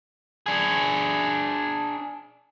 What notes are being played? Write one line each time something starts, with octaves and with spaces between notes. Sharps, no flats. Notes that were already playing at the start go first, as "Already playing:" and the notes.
D4 G#4